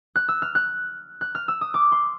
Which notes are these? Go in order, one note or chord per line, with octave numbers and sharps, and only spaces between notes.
F#6
E6
F6
F#6
F#6
F6
E6
D#6
D6
C6